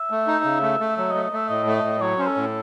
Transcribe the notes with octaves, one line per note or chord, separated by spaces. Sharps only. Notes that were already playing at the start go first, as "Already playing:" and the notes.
Already playing: E5
A3
D#4
C#3
A3
A3
F#3 E5
D#5
A3
D#5
A3 E5
A2 D#5
A3
D#5
A2
F#3 C#5
C#4 C5
A4
A2